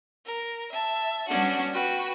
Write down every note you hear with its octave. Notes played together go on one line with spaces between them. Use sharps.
A#4
E5 A5
G3 B3 C#4 D4 F#4
F#4 B4 G5